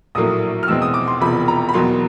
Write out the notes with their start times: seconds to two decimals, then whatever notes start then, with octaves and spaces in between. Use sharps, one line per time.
0.15 A#1 A2 F#3 A#3 D#6
0.63 F6
0.67 E2 B2 G#3 C4 E6
0.82 D#6
0.94 D6
1.08 C6
1.20 E1 E2 C3 F3 B5
1.48 A#5
1.69 B5
1.74 E2 B2 F#3 A#3 C6